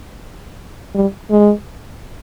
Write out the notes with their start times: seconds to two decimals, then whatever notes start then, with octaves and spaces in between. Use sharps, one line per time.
0.95 G3
1.30 G#3